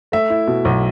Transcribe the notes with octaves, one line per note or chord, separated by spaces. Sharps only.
A3 E5
E4
B2
B1